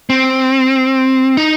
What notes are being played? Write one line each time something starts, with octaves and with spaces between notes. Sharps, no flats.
C4
D#4